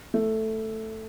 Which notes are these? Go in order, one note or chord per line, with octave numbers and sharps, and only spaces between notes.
A3